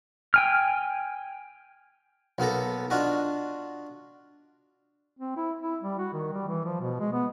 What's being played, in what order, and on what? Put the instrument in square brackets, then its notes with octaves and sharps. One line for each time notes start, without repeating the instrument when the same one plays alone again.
[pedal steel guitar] G5 G#5 F6
[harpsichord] B1 A#3 B3 A4 A#5
D4 F4 F#4 D#5
[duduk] C4
E4
E4
G3
F#4
D#3
G3
E3
F3
B2
G#3
B3